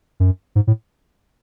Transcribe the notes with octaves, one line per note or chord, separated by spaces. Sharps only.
F#2
G#2
A2